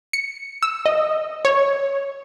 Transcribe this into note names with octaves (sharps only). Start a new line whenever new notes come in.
C#7
E6
D#5
C#5